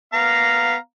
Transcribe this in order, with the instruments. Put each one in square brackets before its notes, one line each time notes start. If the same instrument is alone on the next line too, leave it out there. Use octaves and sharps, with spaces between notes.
[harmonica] B3 F5 A#5